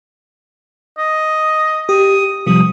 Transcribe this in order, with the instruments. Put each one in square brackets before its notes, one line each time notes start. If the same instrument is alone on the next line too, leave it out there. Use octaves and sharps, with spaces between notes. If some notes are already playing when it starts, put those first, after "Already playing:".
[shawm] D#5
[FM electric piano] G4 [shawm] D#6
[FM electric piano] C3 F3 G3 [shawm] D#6